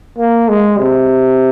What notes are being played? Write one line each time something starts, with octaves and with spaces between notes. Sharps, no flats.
A#3
G#3
C3